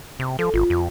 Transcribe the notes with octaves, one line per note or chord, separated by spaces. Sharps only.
C3
F3 A4
G#1 F4
F2